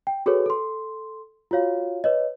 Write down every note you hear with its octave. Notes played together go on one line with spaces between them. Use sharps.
G5
F#4 G#4 A4 B4 C#5
A4 C6
F4 F#4 C#5 F5
B4 C#5 D#5